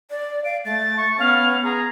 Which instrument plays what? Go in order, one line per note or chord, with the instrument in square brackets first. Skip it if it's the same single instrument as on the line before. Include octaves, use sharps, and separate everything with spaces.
[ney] D5
[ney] F5 [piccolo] D7
[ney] A3 [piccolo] A6
[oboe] C#6
[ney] B3 [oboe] C#4 [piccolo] F5
[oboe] G#4 [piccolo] A#5